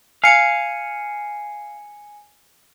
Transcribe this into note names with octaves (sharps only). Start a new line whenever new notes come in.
F5 G#5 C#7